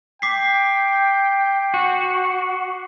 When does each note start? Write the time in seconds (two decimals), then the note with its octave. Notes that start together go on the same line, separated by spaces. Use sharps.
0.22 G5 D6 B6 C7
1.74 F#4